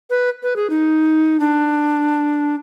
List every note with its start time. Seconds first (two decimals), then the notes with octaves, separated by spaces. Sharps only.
0.10 B4
0.43 B4
0.56 G#4
0.70 D#4
1.40 D4